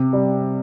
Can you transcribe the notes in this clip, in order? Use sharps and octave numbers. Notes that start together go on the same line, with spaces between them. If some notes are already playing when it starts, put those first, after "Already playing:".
Already playing: C3
G3